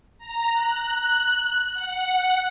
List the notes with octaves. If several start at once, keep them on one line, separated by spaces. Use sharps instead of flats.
A#5
F#6
F#5